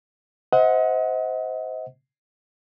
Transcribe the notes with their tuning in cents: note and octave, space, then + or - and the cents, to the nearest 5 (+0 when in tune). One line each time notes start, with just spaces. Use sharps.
C5 -20 D#5 +40 F#5 -10